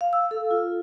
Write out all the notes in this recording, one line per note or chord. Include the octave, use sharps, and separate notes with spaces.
F5
E6
A4
F4